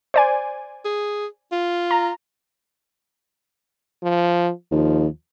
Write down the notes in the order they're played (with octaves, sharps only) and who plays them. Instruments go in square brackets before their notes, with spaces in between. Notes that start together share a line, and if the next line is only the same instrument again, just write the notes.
[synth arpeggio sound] C5 D5 G#5
[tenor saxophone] G#4
F4
[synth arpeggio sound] A#5
[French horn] F3
[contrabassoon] D#2 [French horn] F3